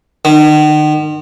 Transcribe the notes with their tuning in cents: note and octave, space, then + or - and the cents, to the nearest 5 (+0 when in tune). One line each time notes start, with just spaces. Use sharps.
D#3 -40